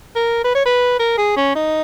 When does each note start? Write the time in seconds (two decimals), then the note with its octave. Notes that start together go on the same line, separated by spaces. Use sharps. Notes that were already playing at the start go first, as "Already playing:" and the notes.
0.16 A#4
0.44 B4
0.55 C#5
0.65 B4
0.99 A#4
1.18 G#4
1.36 C#4
1.55 D#4